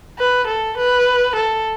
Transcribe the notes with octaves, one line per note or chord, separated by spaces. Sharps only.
B4
A4
B4
A4